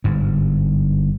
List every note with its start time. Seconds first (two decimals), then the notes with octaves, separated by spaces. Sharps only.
0.04 G1 G#2